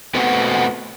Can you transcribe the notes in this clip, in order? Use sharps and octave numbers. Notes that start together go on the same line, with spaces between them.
A3 B3 C4 F#4 B4 F#5